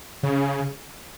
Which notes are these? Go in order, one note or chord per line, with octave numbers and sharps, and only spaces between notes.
C#3